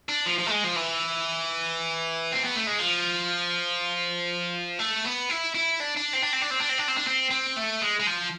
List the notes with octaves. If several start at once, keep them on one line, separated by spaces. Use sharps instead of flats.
D4
F3
F3
A3
G#3
F3
E3
C4
B3
A3
G#3
F3
A3
B3
E4
E4
D4
D4
C4
D4
C4
D4
C4
D4
C4
D4
C4
D4
C4
C4
A3
G#3
G#3
F3